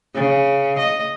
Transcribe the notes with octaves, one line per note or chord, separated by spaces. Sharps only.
C#3
D#5